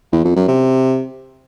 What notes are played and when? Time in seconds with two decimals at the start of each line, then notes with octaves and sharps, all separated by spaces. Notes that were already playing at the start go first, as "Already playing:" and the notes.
0.13 E2
0.24 F2
0.36 F#2
0.48 C3